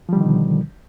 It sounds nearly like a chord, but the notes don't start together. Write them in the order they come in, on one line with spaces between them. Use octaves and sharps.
F3 G3 D3 D#3 B2